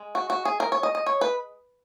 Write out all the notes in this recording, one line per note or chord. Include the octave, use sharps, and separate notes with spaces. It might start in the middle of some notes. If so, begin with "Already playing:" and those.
Already playing: G#3
F#4
F#4
G#4
A#4
C#5
D#5
D#5
C#5
B4